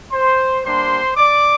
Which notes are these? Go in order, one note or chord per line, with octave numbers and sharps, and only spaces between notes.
C5 C6
G3 A#3 D4 G4 C5 C6
D5 D6